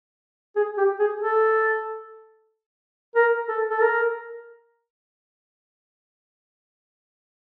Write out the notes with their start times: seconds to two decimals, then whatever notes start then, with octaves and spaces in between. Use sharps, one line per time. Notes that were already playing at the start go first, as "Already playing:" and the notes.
0.56 G#4
0.78 G4
0.99 G#4
1.21 A4
3.16 A#4
3.48 A4
3.70 A4
3.82 A#4